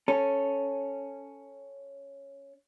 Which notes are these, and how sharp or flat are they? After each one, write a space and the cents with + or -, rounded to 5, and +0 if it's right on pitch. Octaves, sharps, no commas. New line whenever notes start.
C#4 +0 A4 +0